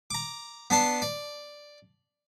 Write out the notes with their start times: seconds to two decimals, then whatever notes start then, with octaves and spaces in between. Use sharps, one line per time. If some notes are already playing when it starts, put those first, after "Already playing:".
0.11 A#5 D6
0.70 B3 D4 A5 C6
1.02 D5